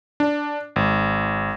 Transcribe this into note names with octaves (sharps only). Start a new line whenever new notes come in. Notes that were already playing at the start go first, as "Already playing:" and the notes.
D4
G#1